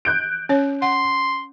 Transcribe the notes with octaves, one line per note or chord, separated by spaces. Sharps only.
F#6 G6 D7
C#4 C#5
F#5 C6